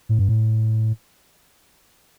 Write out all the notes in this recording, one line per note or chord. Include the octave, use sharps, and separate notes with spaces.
A2
G2
A2